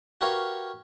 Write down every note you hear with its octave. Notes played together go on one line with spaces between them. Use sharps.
F#4 G4 A#4 B4 C#5 F5